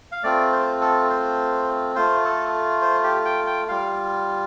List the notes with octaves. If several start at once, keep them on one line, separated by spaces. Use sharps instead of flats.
F5
A3 C4 F4 D5
C5
A4
C5
A3 F4 C5
A4
C5
G4
G5
G5
G3 F4 F5